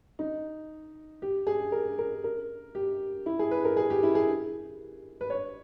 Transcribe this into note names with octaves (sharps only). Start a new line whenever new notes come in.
D#4
G4
G#4
A#4
A#4
A#4
G4
E4
G#4
B4
A#4
G#4
G4
E4
G#4
B4
C#5